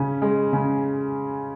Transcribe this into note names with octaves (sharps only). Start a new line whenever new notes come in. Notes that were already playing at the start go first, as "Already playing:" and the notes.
Already playing: C#3 C#4
G#3
C#3